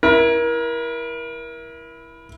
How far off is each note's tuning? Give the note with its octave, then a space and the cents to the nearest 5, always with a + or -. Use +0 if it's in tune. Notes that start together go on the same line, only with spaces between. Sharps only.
E4 +0 A#4 +30